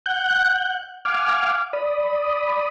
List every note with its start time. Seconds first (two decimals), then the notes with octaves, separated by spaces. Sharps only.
0.06 F#5 F#6 G6
1.05 F5 F#5 G#5 D6 F6
1.73 D5 B5 D#6